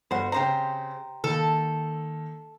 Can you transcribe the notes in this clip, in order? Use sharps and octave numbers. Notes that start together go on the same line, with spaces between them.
G1 F#4 C5
C#3 C4 G4 C5 A#5
D#3 A#3 A4